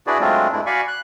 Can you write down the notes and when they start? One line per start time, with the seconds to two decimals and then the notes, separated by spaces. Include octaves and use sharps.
0.07 D4 E4 F#4 G#4 B4 D5
0.20 F#3 G#3 A3 C4 D4 F4
0.52 G2 G#3 A3 D4 E4
0.66 F#4 D5 F5 G#5 B5 C#6
0.88 F#6